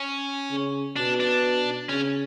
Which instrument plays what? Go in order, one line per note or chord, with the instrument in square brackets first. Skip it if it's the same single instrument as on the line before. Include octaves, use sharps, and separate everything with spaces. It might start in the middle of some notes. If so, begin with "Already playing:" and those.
Already playing: [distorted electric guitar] C#4
[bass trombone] C#3
[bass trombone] B2 [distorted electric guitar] D4
[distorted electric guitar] D4
[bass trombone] C#3 [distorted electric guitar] C#4